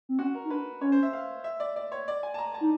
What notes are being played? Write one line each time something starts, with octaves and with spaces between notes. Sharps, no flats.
C4
C#4 F#4
A#4
D#4
D4 B4
C#4 C#5
C5
E5
F5
E5
D5
D5
C#5
D5
G#5
A5
A#5
A5
D#4